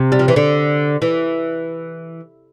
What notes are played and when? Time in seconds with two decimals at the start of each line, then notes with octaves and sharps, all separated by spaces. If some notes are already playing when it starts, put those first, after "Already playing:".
Already playing: C3
0.12 G3
0.19 F3
0.28 E3
0.36 D3
1.02 E3